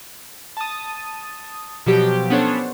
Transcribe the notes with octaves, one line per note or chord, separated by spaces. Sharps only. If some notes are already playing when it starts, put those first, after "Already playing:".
A5 D#6
B2 F3 F#3 G4
B3 C#4 D4 A4 C5 C#5